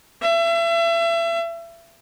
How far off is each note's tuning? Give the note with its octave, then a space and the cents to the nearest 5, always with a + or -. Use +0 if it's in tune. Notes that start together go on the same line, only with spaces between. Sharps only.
E5 +35